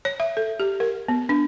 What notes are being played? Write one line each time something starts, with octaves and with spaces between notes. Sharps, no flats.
C#5
E5
A4
G4
A#4
B3
D4